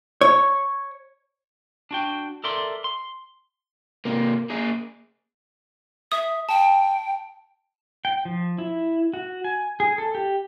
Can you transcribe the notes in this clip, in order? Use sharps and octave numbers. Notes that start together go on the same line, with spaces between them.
C#5
D4 F#4 G5
A4 A#4 D5 E5 C6
C6
C3 A#3
A#3 G#4
E5 D#6
G5 A5
G5
F3
E4
F#4
G#5
G#4
A4
G4